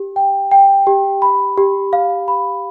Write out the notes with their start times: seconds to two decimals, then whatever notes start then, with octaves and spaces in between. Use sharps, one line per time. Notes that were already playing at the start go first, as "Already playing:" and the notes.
Already playing: G4
0.16 G5
0.51 G5
0.87 G4
1.22 B5
1.58 G4
1.93 F5
2.28 B5